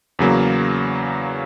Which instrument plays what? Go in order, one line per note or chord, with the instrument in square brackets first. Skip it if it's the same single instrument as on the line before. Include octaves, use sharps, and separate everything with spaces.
[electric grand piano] E2 C#3 F#3 A#3